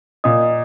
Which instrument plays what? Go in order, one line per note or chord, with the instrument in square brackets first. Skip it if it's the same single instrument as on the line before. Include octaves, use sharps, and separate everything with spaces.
[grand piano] A#2 [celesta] D#5 D#6